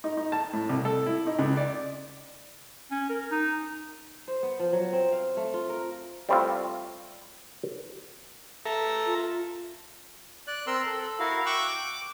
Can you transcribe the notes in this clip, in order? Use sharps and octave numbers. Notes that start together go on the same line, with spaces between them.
D#4
D#4
A5
A2
C2
A4
E4
D#4
C#2
D5
C#4
A#4
D#4
C5
B3
F3
F#3
C4
F5
A3
F4
A#4
G3 A3 C4 E4 F4
A4 E5 A#5
F4
D5 F#6
C4 A#4 C6 E6 F#6
A4
E4 F#4 A#4 F5
G5 C#6 D6 E6 F#6
D6